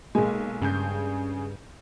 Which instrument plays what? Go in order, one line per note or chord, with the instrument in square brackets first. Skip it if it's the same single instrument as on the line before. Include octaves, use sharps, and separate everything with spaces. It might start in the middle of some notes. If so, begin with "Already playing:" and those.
[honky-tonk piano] B1 G#5 [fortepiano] G#3 A#3
[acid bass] G2 [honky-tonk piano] C#3 G#4 G6